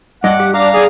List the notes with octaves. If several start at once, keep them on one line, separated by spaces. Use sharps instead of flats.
G2 D#5 F#5 D6
G4
D4 F5 A#5 D6
G#4 D5 G#5